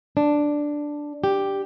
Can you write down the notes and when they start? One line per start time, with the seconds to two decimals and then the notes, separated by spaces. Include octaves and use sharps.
0.17 D4
1.24 G4